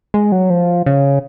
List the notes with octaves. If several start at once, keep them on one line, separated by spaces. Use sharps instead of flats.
G#3
F#3
F3
C#3